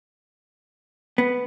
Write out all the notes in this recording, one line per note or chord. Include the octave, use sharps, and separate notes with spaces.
B3